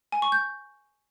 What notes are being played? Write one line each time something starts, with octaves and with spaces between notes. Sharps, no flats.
G#5
C#6
G6